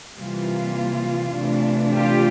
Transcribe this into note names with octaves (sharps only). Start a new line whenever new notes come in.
C3 E3 G3 A#3 F4
C3 E3 A3 D4
F4 G4